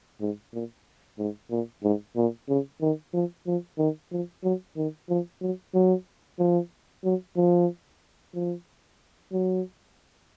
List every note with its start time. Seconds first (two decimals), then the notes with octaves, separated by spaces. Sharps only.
0.21 G#2
0.53 A#2
1.18 G#2
1.51 A#2
1.84 G#2
2.16 A#2
2.49 C#3
2.81 D#3
3.14 F3
3.46 F3
3.78 D#3
4.12 F3
4.44 F#3
4.76 D#3
5.09 F3
5.41 F#3
5.74 F#3
6.39 F3
7.04 F#3
7.37 F3
8.34 F3
9.32 F#3